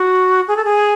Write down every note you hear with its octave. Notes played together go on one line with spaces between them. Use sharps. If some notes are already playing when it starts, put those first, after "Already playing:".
Already playing: F#4
G#4
A4
G#4